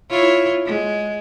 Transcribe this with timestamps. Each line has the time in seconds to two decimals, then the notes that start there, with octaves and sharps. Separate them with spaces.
0.11 E4 F4 C#5
0.66 G#3